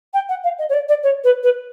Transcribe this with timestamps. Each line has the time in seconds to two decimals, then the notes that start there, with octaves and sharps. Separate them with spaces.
0.13 G5
0.28 F#5
0.43 F5
0.58 D#5
0.69 C#5
0.73 D5
0.88 D5
1.03 C#5
1.24 B4
1.43 B4